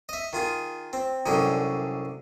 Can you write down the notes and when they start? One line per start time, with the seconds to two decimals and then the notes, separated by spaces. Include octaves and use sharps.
0.09 D#5 E5
0.33 D#3 F4 G#4
0.93 C4
1.26 C2 F#2 D3 G#3 G5